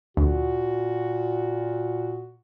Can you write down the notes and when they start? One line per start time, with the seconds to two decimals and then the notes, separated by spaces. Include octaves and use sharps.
0.17 D2 A#2 F#4